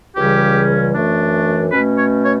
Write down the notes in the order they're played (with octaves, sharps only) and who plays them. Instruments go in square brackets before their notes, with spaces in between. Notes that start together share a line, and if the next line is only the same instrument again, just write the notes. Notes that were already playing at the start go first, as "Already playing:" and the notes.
[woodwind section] C#2 C#3 E3 G3 C#4 G4
F#2 E3 A3 D4
B2 A3 C#4 B4
C#5
C#5